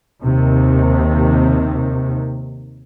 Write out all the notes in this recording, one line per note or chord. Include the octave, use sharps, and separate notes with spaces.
D#2 C3 D#3